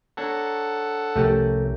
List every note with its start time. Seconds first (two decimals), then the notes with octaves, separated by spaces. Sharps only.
0.17 D4 A4 C#5 F#5 A#5
1.16 C2 F3 A3 C#4 G4 A#4